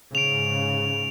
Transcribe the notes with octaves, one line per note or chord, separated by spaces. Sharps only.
G#2 C#3 D7 F7